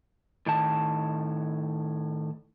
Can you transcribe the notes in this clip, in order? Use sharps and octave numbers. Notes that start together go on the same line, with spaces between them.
A2 D#3 A5